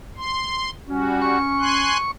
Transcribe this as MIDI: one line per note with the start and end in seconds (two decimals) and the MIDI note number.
0.17 0.70 84
0.88 1.39 55
0.88 1.91 61
0.88 1.39 66
1.22 2.11 85
1.60 1.97 80
1.60 1.97 84
1.60 1.97 90